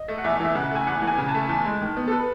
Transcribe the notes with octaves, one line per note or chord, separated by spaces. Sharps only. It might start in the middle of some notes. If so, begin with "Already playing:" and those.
Already playing: D#5
A3
F#5
E2 E5
E3
E5
C#3 F#5
A3 G#5
E2 F#5
E3
G#5
C#3
A5
A3
E2
G#3
D#3
B3
A4
B4